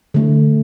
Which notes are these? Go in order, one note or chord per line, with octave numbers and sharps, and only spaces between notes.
D3 A3